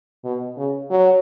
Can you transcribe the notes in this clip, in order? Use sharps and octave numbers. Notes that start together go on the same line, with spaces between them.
B2
C#3
F#3